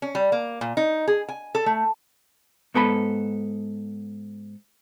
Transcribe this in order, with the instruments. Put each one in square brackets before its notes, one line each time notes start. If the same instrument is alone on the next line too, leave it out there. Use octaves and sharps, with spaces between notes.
[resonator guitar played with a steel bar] C#4
G3
A#3
A#2
D#4
G#4
G#5
A4
A3
[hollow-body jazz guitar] G#2 B3 A4 A#5 B5